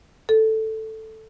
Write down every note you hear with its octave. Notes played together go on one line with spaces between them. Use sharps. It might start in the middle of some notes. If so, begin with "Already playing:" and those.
A4